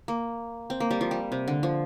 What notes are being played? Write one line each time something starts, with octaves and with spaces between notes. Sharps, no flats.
A#3
C4
A#3
G3
F3
G3
C3
D3
F3